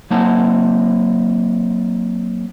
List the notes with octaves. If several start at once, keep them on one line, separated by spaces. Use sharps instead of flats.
F#3 A#3 C4 D#4 F#5 A5